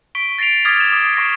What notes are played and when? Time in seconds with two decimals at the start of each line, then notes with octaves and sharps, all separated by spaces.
0.15 C#6 B6 D7 G7
0.38 A6 A#6 C7 D7 F7
0.65 D6 D#6 F6 G#6 A6 B6
0.80 E7
0.92 D6 D#6
1.14 C#6 A#6 C7 D7